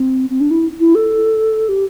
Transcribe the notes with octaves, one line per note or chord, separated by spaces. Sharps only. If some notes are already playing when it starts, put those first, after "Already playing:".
Already playing: C4
C4
D4
E4
E4
A4
G4